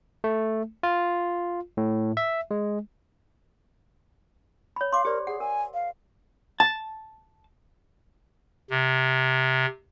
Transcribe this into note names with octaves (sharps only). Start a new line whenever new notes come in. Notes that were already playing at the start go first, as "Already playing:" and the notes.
A3
F4
A2
E5
G#3
C#5 B5
F5 C6 D6
G4 A#4 C5 D5
G#4 F#5
A#4 G#5
F5
A5
C3